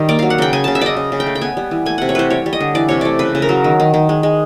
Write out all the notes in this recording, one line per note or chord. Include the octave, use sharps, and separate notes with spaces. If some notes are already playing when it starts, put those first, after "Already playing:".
Already playing: D#3 G3
A#3 D5
F#3 F5
F#5
C#3 G5
C#3 G#5
C#3 A5
E5
C#3 D5 D#5
C#3
C#3
G5
A3
G5
B3 G#5
G3
E3
A3 G#5
C3 F#5
C#5
E3 B4 C5
G3 C#5
G3
D#5
D3
E3 D5
C3 C#5
A3 D5
C#3 B4
C#3
A#4
F#3
D#3
D#3
D#3
G#3
G#3